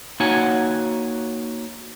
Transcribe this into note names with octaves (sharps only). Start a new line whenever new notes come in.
A#3 D#4 F#4 C#5 F#5 G#5